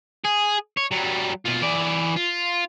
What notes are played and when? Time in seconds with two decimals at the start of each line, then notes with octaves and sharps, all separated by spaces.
0.24 G#4
0.77 C#5
0.91 F#3 G3
1.46 B2 F4
1.62 E3 D5
2.16 F4